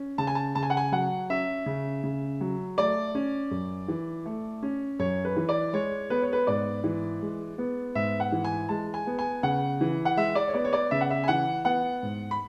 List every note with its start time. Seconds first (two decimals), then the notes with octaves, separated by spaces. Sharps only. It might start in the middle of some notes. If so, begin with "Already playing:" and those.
Already playing: C#4
0.18 C#3 A5
0.27 G#5
0.35 A5
0.55 C#3 A5
0.63 G#5
0.70 F#5
0.77 G#5
0.92 F#3 F#5
1.30 C#4 E5
1.66 C#3
2.04 C#3
2.41 F#3
2.78 A3 D5
3.15 C#4
3.51 F#2
3.88 E3
4.26 A3
4.63 C#4
4.99 F#2 C#5
5.25 B4
5.37 E3
5.49 D5
5.73 G#3 C#5
6.10 B3 B4
6.22 C#5
6.33 B4
6.47 G#2 D5
6.84 E3
7.21 G#3
7.58 B3
7.95 G#2 E5
8.20 F#5
8.32 E3
8.44 G#5
8.69 G#3 A5
8.94 G#5
9.07 B3
9.19 G#5
9.43 C#3 F#5
9.81 E3
10.05 F#5
10.17 G#3 E5
10.35 D5
10.48 C#5
10.54 B3 D5
10.65 C#5
10.73 D5
10.91 C#3 E5
11.01 F#5
11.10 E5
11.24 G#5
11.28 E3 F#5
11.65 B3 F#5
12.03 G#2
12.31 B5